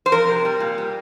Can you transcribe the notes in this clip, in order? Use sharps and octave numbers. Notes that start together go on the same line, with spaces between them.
C5
F2 A#4
C3
G3
A#2
G3